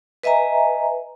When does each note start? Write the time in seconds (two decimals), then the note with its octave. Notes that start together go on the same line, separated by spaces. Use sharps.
0.23 B4 D#5 E5 G#5 A#5